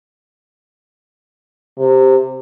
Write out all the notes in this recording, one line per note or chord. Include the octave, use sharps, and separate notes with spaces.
C3